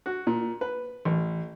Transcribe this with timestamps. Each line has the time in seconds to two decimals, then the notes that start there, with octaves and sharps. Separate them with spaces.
0.06 F#4
0.27 A#2
0.61 B4
1.05 A1